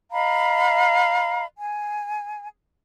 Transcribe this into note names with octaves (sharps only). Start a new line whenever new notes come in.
D#5 F5 A#5 B5
G#5